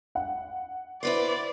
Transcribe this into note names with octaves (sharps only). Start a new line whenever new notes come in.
F#5
E4 B4 C5 D5